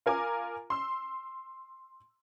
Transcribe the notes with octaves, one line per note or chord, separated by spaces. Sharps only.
F4 A#4 G#5 A#5 D6
C6 E6